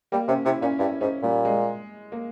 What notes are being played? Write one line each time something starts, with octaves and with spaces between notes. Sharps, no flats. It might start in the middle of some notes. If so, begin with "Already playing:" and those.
G3 A#3
C3 C#4
C3 E4
A#2 C#4
G2 E4
G#2 C#4
A#2 G3
G#3
A#3